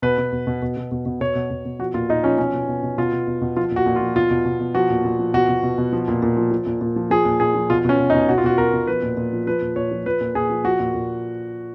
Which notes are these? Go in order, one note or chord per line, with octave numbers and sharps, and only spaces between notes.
B2 B4
B2
B2
B2
B2
B2
B2
B2
B2 C#5
B2
B2
B2
F3 F#4
A#2 F4
A#2 D#4
F3 C#4
B2 C#4
B2
B2
B2
B2 F4
B2
B2
B2
F3 F4
A#2 F#4
A#2
F4
F3
B2 F4
B2
B2
B2
F3 F#4
A#2
A#2
F3
B2 F#4
B2
B2
B2
F3
A#2
A#2
F3
F3
A#2
A#2
F3
F3 G#4
A#2
A#2 G#4
F3
B2 F4
B2 C#4
B2
D#4
B2
B2 F#4
F4
B2 F#4
B2 A#4
B2
F3 B4
A#2
A#2
F3
F3 B4
A#2
A#2 C#5
F3
F3 B4
A#2
A#2 G#4
F3
F3 F#4
A#2
A#2